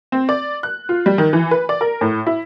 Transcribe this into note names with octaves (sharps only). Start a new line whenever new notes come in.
C4
D5
F#6
F4
G3
D#3
E3
B4
D5
A#4
A2
E4